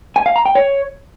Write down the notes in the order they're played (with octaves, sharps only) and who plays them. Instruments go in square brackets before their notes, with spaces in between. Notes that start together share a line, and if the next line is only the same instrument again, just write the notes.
[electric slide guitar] G#5
F5
A#5
G5
C#5